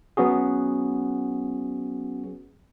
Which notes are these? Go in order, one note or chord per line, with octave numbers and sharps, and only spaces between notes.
F#3 B3 C#4 F#4 G#4